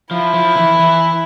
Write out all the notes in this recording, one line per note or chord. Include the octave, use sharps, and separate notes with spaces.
F3 E4
F3
E3
E3